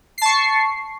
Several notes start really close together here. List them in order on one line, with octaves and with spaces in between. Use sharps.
C7 A5 C#6